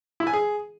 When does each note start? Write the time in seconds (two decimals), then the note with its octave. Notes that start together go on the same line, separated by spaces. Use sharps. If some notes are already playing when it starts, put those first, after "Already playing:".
0.20 E4
0.27 G#5
0.33 G#4